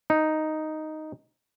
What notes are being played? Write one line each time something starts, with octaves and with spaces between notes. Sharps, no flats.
D#4